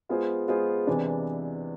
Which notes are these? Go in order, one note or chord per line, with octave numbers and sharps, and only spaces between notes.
G#3 B3 F4 G#4 C5
G#3 B3 F4 G#4 C5
E2 C3 E3 G#3 D4